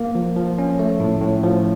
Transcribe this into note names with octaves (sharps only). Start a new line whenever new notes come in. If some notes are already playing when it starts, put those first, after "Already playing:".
Already playing: A#3
F3
F3
C#4
A3
A2
A2
F3